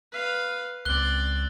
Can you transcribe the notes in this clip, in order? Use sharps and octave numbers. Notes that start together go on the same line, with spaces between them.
B4 F5
C#2 C4 D5 F#6 G7